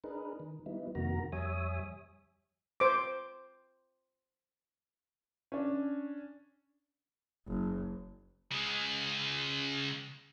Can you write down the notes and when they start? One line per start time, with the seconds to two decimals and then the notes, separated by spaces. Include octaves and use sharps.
0.04 D4 D#4 G#4 A#4 B4
0.40 D#3
0.66 G3 B3 D#4 E4
0.95 F2 C3 D#3 A#3 F#4 A#5
1.32 F2 G3 C#5 E5 G#5 D#6
2.80 C5 D6
5.52 C#4 D4
7.48 F#1
8.52 C#3 G#3